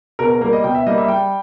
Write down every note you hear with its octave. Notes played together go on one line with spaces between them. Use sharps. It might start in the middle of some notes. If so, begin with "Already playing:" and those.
B2 A#4
A#4
G3 A#3 A#4
D#5
B2 G5
E5
G3 A#3 D#5
E5
G3 G5